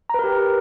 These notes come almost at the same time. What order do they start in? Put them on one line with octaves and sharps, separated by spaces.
A#5 B4 A#4 G4